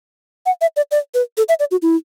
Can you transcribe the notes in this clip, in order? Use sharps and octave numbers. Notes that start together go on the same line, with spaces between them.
F#5
E5
D5
D5
B4
A4
E5
D5
F#4
E4